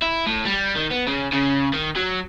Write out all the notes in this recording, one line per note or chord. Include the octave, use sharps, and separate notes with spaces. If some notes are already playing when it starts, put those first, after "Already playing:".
E4
A2
G3
D#3
B3
C#3
C#3
D#3
F#3